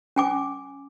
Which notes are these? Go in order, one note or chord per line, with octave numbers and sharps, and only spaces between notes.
C#4 G#5 D6